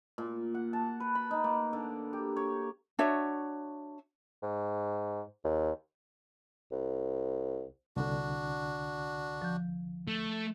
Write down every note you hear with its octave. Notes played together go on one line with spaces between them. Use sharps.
A#2
F#5
A5
B4
B5
D#4
A#3
D3
G4
C#5
D4 F#4 C#5 E5
G#2
D#2
C2
C2 D3 D4 F#4
F3 G6
A3